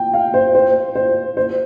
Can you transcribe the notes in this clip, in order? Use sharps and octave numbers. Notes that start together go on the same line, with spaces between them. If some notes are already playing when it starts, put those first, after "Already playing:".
Already playing: G5
F5
C5
C5
C5
C5